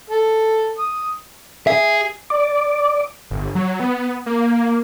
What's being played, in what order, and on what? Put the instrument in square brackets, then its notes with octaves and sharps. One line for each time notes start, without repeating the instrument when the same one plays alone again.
[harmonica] A4
D#6
[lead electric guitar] G#4 [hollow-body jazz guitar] E5
[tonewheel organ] D5
[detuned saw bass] G1
F#3
B3
A#3